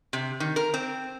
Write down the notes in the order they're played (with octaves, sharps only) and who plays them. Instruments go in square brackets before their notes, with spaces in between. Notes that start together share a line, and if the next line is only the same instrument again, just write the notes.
[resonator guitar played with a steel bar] C3
D#3
A#4
C4